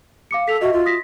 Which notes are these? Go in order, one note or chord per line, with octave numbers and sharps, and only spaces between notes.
F5 D6 C#7
A4 B6 F7
F#4 D#5 E5
F4
D#6 A#6 B6